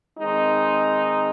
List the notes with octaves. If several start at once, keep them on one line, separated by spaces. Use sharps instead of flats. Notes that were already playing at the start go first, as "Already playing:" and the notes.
D#3 G#3 C4 D#4